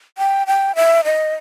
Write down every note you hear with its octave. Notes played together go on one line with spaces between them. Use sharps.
G5
G5
E5
D#5